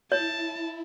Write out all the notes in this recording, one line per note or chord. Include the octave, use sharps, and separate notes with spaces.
E4 C#5 A5